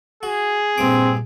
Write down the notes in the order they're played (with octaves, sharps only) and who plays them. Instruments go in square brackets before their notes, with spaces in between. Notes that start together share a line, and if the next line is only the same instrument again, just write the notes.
[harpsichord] F#4 [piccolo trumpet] G#4
[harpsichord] A#1 G2 D6 [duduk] C4